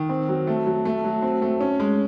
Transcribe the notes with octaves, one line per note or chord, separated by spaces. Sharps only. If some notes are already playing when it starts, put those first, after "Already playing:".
Already playing: D#3
C4
F#3
A3
F#3
A3
F#3
C4
A3
C#4
G#3